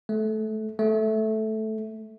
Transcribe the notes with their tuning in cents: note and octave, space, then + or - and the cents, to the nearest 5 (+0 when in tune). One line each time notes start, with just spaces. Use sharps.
A3 -20
A3 -10